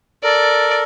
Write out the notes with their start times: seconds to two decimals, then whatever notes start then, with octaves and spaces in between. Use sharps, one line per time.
0.23 A4 A#4 D5